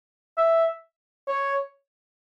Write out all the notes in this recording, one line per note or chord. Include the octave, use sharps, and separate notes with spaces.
E5
C#5